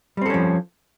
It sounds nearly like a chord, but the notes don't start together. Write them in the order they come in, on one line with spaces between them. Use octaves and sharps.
G3 C4 A4 C#4 F3